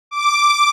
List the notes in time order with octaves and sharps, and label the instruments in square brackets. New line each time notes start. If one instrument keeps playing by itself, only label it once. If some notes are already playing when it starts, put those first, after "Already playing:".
[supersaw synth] D6